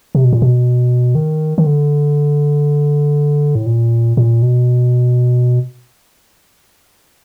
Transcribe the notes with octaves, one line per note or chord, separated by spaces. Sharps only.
C3
B2
A#2
B2
D#3
D#3
D3
A2
A#2
A#2
B2